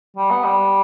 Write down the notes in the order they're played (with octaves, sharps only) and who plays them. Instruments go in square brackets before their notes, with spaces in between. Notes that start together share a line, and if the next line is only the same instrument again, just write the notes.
[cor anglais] G3
B3
G3